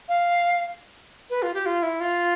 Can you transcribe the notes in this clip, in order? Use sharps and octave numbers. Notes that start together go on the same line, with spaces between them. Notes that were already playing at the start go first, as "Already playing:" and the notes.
F5
B4
F4
G4
F4
E4
F4